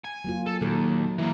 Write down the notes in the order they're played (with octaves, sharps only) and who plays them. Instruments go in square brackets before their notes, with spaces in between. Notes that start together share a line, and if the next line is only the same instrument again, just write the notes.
[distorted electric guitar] G#5
[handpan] F#3 A#3 F4
[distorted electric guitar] A4
[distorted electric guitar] D#2 [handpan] A#2 F#3 A4
[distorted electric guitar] E3 A#3